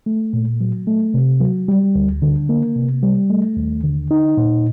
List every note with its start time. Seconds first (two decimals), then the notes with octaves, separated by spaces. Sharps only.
0.06 A3
0.33 A#2
0.61 F#3
0.87 A3
1.14 C3
1.41 F#3
1.68 G3
1.95 D2
2.22 D3
2.49 A#3
2.76 C3
3.03 G3
3.30 A3
3.57 D#2
3.83 D3
4.11 D#4
4.37 A#2